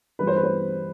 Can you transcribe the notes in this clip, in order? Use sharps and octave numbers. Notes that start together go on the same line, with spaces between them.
G2 E3 G3 B4
C5
B4
C5